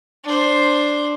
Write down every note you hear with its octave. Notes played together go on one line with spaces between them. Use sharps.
D4 C5